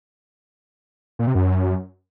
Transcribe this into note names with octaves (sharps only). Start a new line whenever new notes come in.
A#2
C3
F#2